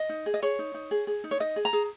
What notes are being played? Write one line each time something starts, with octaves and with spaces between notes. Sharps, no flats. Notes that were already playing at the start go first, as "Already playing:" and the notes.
Already playing: D#5
D#4
G#4
D#5
G#4 C#5
D#4
D#4
G#4
G#4
D#4
C#5
D#4 D#5
G#4
A#5
G#4